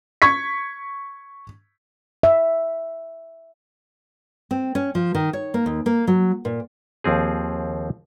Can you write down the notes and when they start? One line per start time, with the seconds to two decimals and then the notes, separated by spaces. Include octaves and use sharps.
0.22 C#6 G#6 B6
2.23 E5
4.51 C4
4.75 C#4
4.95 F3
5.15 D#3
5.33 C#5
5.54 A#3
5.66 D#2
5.86 A#3
6.07 F#3
6.45 A#2
7.04 D#2 F3 C4 G#4